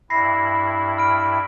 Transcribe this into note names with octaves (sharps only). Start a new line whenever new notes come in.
G2 E4 B5 A#6 C7
B5 F6 D7